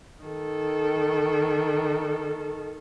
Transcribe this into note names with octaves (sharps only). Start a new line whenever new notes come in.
D#3 A4